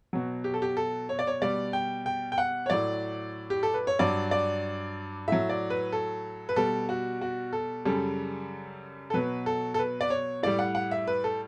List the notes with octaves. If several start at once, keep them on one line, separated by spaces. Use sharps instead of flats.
B2 F#3
G4
A4
G4
A4
C#5
D5
C#5
B2 G3 D5
G5
G5
G5
F#5
C#5
A2 F#3 D5
G4
A4
B4
C#5
G2 F#3 D5
D5
A2 F#3 E5
D5
B4
A4
B4
B2 G3 A4
F#4
F#4
A4
F#2 C#3 G3 A4
A4
B2 F#3 B4
A4
A4
B4
D5
C#5
A2 G3 D5
F#5
F#5
E5
B4
A4